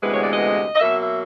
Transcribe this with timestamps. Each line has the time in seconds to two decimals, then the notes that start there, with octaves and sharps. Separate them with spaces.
0.02 D2 C3 E3 G#3 B3 B4
0.12 C#5
0.22 D5
0.31 D#5
0.75 D#5
0.80 B2 F#3 A#3 E5
1.00 E5